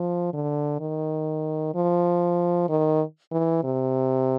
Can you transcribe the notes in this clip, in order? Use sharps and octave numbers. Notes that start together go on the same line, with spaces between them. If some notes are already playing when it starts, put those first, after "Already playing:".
Already playing: F3
D3
D#3
F3
D#3
E3
C3